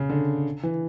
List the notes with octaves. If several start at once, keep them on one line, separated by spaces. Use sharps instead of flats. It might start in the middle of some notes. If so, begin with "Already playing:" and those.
Already playing: C#3
D3
E3